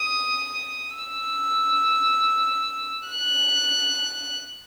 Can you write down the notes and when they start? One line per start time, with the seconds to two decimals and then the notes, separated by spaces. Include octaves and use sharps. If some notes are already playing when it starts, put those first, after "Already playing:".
Already playing: D#6
0.96 E6
3.08 F#6